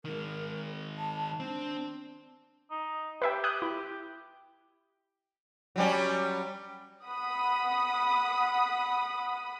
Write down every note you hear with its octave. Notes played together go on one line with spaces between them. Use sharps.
D#3 G#3 A#4
A5
C4 D4
D#4
G4 B4 E5 G5
D#6 F#6 G6
E4
F#3 G3 C#4
F#5 B5 D#6